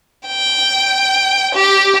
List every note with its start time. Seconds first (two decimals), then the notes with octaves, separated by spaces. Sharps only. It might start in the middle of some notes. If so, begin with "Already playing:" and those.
0.27 G5
1.55 G4